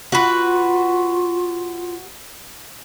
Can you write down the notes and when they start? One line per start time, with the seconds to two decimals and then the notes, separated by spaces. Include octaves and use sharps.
0.12 F4 F#4 B4